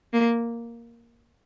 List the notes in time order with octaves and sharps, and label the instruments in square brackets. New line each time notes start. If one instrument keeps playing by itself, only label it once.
[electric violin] A#3